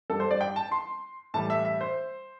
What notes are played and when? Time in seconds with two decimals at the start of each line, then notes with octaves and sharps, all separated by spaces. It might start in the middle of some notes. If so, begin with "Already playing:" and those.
0.10 G2 G3 A4
0.20 C5
0.31 D5
0.41 G5
0.56 A5
0.72 C6
1.34 A2 E3 G3 A5
1.50 E5
1.65 E5
1.81 C5